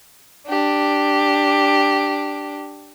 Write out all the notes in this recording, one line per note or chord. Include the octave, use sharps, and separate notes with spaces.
D4 G4